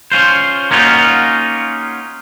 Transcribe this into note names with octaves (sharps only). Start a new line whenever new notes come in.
C#4 F4 C5
A#3 C#4 D#4 F4 F#4